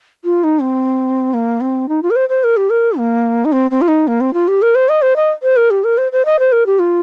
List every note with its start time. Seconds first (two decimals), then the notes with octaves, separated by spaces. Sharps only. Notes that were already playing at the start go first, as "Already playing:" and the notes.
0.24 F4
0.44 D#4
0.61 C4
1.34 A#3
1.61 C4
1.89 D#4
2.03 F4
2.10 A#4
2.16 C5
2.29 C5
2.44 A#4
2.57 G4
2.70 A#4
2.98 A#3
3.45 D#4
3.52 C4
3.71 C4
3.81 F4
3.88 D#4
4.07 A#3
4.20 C4
4.33 F4
4.48 G4
4.62 A#4
4.75 C5
4.89 D#5
5.02 C5
5.16 D#5
5.43 C5
5.56 A#4
5.70 G4
5.84 A#4
5.98 C5
6.12 C5
6.25 D#5
6.39 C5
6.52 A#4
6.66 G4
6.79 F4